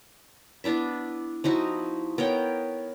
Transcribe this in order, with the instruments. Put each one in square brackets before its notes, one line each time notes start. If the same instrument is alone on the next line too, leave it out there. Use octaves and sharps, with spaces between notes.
[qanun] B3 D4 E4 E5
F3 D#4 E4 F#4
B3 A#4 C#5 G5